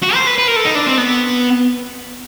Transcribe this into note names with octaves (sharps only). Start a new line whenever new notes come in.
F#4
C5
B4
B4
A#4
A4
D#4
D4
C4
B3